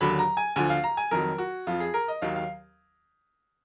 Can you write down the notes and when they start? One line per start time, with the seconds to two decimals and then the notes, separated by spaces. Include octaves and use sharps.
0.01 D#2 D3 F#3 B5
0.19 A#5
0.37 G#5
0.56 D2 D3 F3 G#5
0.70 F5
0.84 A#5
0.97 G#5
1.11 F2 D#3 F#3 A#4
1.38 F#4
1.67 F2 F3 F4
1.80 G#4
1.94 A#4
2.08 D#5
2.22 D#2 D#3 F#3 F5
2.36 F5